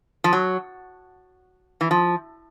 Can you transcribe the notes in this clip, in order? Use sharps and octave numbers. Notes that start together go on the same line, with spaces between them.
F3
F#3
E3
F3